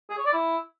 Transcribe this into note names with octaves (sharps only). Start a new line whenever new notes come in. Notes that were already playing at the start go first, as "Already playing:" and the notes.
G#4
C#5
D5
E4